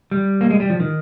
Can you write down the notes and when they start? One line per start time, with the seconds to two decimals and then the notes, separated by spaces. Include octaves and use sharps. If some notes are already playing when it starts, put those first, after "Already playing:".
0.11 G3
0.41 A#3
0.51 G#3
0.60 G3
0.70 F3
0.80 D#3